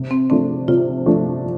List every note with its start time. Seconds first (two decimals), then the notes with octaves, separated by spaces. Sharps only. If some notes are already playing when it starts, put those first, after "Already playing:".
Already playing: C3
0.11 C4
0.30 F3 A3 C4 D4
0.68 C3 F4
1.06 F3 A3 D4